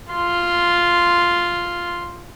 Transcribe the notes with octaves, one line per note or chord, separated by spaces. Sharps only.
F4 C6